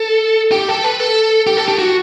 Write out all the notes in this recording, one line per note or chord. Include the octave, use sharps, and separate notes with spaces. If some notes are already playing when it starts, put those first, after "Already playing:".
Already playing: A4
G4
A4
B4
A4
G4
A4
G4
F#4